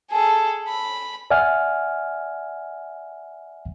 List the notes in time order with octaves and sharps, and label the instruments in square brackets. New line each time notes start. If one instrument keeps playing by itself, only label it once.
[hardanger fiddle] G#4 A4
B5
[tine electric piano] D5 E5 F#5 G#5 F6